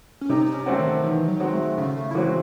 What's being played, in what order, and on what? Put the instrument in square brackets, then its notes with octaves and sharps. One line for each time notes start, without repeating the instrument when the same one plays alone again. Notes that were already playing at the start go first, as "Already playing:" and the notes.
[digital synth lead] C#4
[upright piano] C3 [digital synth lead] D#4
[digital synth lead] D#4
C#4
[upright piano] F#3 A3 C4 F#4
[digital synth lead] D#3
[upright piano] D#3 [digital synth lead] E3
[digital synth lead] F#3
[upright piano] G#3 C4 F#4
[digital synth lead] A3
[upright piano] C#3 [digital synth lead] A3
[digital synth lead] A3
E4
[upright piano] E3 G#3 C4 [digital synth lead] F#4